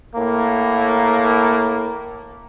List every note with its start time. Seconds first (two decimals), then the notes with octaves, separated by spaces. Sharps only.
0.16 A2 A#3